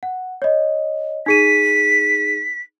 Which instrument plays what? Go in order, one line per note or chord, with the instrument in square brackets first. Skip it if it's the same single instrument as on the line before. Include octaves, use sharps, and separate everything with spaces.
[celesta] F#5
C#5 D#5
[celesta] D#4 G#4 D#7 [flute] B6